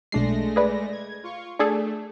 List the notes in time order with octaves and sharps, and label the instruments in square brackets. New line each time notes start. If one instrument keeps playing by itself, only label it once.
[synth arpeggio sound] B1 D4 C7 [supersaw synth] G#3 A3 A#6
[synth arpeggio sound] G#4 B4 D5
[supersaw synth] G#6
F4 C#6
[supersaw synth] A3 [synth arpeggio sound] D4 G#4 A4